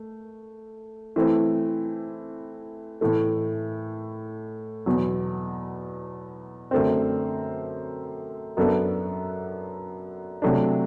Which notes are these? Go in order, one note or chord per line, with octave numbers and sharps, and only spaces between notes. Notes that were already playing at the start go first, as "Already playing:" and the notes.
Already playing: A3
E3 A3 C4 E4
A2 E3 A3
E2 B2 F#3
F#2 D3 A3 C4
F#2 F#3 B3 D4 A4
C3 F#3 A3 D4